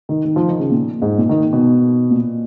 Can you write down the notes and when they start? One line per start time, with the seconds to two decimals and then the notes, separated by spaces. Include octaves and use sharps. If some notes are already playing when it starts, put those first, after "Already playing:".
0.09 D#3
0.25 D#3
0.36 F3
0.48 D#3
0.59 C#3
0.71 A#2
1.02 G#2
1.18 A#2
1.29 D#3
1.53 B2
2.11 A#2